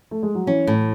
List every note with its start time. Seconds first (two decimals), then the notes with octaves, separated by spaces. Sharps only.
0.11 A3
0.23 G#3
0.35 F#3
0.46 E3 C#4
0.67 A2